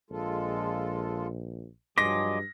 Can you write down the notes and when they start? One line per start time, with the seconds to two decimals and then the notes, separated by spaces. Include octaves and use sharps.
0.10 A#1 G#3 F4 A4
1.98 G2 F3 F#3 G#4 D#5 C6 D6 A#6